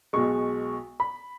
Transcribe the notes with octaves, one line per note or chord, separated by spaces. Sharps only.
B1 B2 G#3 C#6
B5